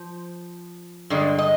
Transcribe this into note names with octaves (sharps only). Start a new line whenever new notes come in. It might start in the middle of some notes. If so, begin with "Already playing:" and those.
Already playing: F3 C5
G2 D3 G#3
D#5